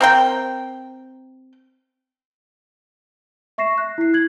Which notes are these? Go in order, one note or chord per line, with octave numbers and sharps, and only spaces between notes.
C4 A#4 G5
E5 C#6 A#6 C7 E7
F#6 A#6
E4 C7
F#6 G#6 F#7